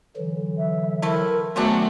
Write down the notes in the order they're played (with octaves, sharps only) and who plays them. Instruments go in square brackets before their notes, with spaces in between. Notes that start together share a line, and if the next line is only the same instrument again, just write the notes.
[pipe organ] D3 E3 F#3
[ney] E5
[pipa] A3 C4 E4 [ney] A#4
[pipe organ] D#3 [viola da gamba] F#3 A3 F#4 [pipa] G#3 C4 D4 [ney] B3